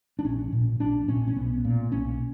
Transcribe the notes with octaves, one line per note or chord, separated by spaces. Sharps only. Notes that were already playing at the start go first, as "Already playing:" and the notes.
D4
A#1 C#4
A#2
A#1 D4
A#2 C#4
C#4
B1 B3
A#2
B1 C#4